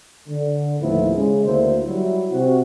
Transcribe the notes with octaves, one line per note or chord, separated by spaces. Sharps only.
D3
D#2 A2 F3 B3 E4
C#3 G#3
D2 D3 A#3 E4 C5
F#3 G3 E4
C3 C4 F#4